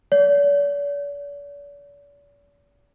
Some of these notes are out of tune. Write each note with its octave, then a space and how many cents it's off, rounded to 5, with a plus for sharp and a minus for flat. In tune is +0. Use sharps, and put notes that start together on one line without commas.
D5 -45